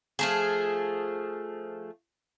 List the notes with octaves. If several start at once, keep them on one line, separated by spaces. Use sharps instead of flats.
F3 A3 G#4